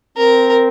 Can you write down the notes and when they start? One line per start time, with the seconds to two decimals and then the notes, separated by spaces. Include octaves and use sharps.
0.17 C4 A#4